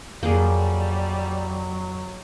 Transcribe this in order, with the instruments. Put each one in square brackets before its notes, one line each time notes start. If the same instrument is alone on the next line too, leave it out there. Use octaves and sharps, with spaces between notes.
[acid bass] F2 [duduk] F#3 [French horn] G3 [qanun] A#3 G#4